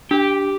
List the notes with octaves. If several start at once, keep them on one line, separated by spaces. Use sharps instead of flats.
D4 G4